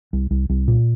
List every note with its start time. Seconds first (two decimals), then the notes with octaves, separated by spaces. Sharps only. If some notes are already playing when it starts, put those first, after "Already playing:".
0.13 C2
0.31 C2
0.49 C2
0.68 A#2